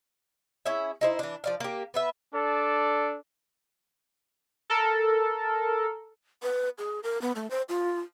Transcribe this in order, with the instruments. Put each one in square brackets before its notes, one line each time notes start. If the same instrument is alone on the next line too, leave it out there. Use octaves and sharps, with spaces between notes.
[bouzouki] C#4 E4 G#4 E5
D#4 E4 C5
E3 D4
F3 D5 F5
A#3 G4
B3 B4 E5
[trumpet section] D4 A4 D5
[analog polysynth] A4 A#4
[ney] B4
G#4
A#4
B3
A3
C5
F4